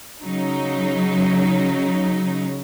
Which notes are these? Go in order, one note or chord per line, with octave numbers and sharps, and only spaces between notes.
C#3 F#3 D#4